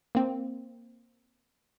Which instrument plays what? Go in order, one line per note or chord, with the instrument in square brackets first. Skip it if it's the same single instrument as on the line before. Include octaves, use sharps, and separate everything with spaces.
[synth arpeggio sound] A#3 C4